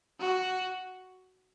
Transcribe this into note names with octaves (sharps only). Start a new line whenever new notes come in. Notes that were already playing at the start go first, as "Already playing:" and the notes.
F#4